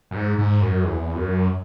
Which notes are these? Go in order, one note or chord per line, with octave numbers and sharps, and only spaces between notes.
F#2
G#2
G#2
F#2
E2
F#2